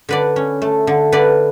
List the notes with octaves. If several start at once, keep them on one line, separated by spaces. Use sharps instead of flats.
D3 B4 D5
C#4
A3
D3
D3 B4 D5